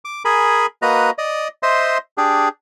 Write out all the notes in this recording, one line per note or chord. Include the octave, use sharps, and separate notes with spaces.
D6
G#4 A#4 G#5 B5
A#3 F#4 B4 D#5 A#5
D5 D#5
C5 D#5 E5 C6
D4 G4 G#4